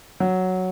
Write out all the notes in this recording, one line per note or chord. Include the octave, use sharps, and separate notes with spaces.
F#3